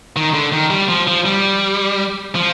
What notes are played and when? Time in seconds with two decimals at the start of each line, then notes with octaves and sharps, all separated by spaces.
0.16 D#3
0.34 D3
0.52 D#3
0.71 G3
0.89 F3
1.08 F3
1.25 G3
2.35 F3